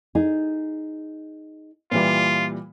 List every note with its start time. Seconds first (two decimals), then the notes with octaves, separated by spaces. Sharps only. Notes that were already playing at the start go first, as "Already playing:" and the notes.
0.15 D#4 G#4
1.91 A#2 E3 G3 F4